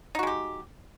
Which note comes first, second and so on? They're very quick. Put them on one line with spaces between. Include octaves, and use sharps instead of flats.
D#4 F#4 G#3 G4